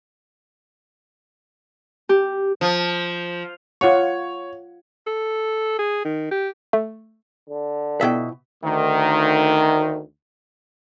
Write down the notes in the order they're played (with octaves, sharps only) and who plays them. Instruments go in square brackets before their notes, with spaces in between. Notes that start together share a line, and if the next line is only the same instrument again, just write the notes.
[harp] G4
[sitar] F3
[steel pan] F4 F#5 C#6 [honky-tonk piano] C#5
[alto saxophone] A4
G#4
D#3
G4
[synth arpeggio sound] A3
[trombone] D3
[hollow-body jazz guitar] B2 E5 [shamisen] F3 E4 G5
[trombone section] D2 D#3